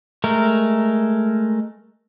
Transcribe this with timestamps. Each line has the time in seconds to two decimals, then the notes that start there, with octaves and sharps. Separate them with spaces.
0.24 G#3 A3 A#4